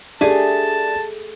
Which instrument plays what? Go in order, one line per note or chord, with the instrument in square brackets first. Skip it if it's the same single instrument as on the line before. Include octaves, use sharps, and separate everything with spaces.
[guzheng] A3 G#4 G#5 [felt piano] D4 G4 [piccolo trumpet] A5